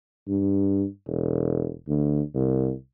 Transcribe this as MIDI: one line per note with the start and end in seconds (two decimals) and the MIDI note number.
0.28 0.85 43
1.07 1.72 28
1.88 2.21 38
2.35 2.72 36